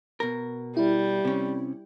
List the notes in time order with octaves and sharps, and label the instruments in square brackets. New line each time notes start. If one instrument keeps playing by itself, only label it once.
[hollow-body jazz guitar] B2 A#4
[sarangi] G3 [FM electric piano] E4
[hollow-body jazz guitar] C3 C#4